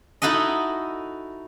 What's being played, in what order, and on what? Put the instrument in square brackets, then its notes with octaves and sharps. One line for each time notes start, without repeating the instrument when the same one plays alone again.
[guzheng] D#4 E4 F#4 A4 D#5